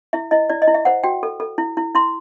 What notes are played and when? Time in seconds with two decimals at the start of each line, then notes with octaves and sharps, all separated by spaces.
0.13 E4 E5
0.31 E4 D#5
0.49 E4 D5
0.62 D#5
0.68 E4
0.74 E5
0.85 C5 F#5
1.03 F#4 G5
1.23 A4
1.40 A4
1.58 E4
1.77 E4
1.95 E4 C6